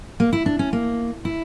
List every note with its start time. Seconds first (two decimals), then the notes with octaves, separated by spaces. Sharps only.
0.20 A#3
0.33 E4
0.46 D4
0.59 C#4
0.73 A#3
1.25 E4